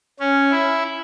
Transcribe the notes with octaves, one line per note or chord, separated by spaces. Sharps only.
C#4
E4